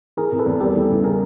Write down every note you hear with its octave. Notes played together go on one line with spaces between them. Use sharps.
E3 G#4 A#4
C3
A4 B4
E2
G3 G4 A4
E3
C#3
G#4 A#4